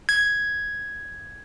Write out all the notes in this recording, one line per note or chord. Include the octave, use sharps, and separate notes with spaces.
G#6